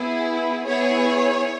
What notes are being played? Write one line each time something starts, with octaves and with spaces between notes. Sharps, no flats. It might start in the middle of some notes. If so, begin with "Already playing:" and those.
Already playing: B3 E4 G#4
B3 E4 G#4 C#5